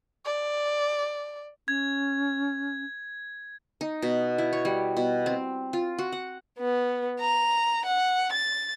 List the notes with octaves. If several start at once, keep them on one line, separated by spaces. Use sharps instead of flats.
D5
C#4 G#6
D#4
B2
E4
C#5
G3
B2
C4
F4
F#4
F#5
B3
A#5
F#5
A6